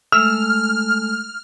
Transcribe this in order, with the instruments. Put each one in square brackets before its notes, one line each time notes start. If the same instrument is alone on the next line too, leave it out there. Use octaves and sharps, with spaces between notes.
[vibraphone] G#3 A3 A4 [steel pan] E6 [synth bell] F6